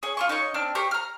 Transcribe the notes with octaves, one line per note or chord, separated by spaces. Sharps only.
G#4 C#5
F4 C6 C#6
D#4 C#5 D#5 C#6
C4 D4 F6
G4 C5 C#6
A#5 F6